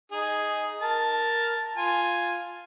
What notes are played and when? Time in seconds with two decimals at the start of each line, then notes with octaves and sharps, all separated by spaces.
0.12 D#4 G#4
0.82 A#4 A5
1.77 F4 G#5